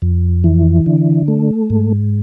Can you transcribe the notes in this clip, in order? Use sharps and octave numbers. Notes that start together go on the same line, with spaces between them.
F2
E3
D3
A3
G#2